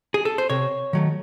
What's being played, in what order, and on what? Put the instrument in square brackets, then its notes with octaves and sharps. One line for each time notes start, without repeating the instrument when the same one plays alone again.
[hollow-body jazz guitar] G#4
A4
C5
C3 C#5
D#3 F#3 A3